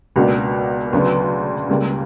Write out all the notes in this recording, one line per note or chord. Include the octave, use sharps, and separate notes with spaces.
C#2 B2 A#3 D4 F#4
D2 C#3 F#3 B3 D4
C#2 C#3 G3 A#3